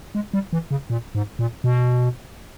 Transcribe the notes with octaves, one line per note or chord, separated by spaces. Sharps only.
G#3
G3
E3
C#3
A#2
G#2
A#2
B2